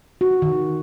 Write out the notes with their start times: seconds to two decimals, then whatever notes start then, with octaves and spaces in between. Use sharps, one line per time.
0.21 F#4
0.42 D#3